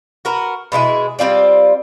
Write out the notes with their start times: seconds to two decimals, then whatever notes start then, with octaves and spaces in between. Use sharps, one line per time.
0.25 F#4 A#4 B4
0.72 B2 G#3 E4 G#4
1.19 G3 C4 F4 D5